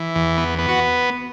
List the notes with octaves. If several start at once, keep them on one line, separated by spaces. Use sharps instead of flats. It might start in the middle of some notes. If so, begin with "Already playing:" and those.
Already playing: E3
E2
B3
B3
F#4